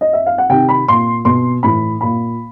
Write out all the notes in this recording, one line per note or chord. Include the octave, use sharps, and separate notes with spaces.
D#5
E5
F5
F#5
C3 D#3 G5
B5
A#2 C6
B2 C6
A2 E3 B5
A#2 B5